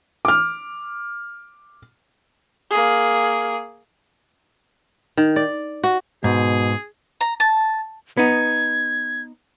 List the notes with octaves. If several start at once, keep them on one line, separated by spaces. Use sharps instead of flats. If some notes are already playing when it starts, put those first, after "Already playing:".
D6 F6
A#3 G#4
D#3
D5
F#4
G#2 B2 G#4
A#5
A5
B3 D#4 G#6